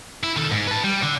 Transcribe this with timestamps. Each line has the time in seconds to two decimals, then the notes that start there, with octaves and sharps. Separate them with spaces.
0.23 E4
0.37 D#3 A4
0.52 G#2
0.68 B4 A5
0.84 G3
1.03 D3